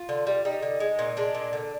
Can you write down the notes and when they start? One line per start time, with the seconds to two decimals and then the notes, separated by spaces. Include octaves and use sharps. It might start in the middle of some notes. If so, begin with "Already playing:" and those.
Already playing: F4
0.09 D3
0.27 G3
0.45 G3 D#4
0.63 D3
0.80 G#3
0.99 A#2
1.17 G#3 D4
1.35 A#2
1.53 D3